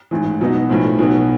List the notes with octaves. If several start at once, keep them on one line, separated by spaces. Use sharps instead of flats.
A1 G#2 E3
B2 F#3 B3 D#4
B1 A2 F3
B1 B2 F#3 B3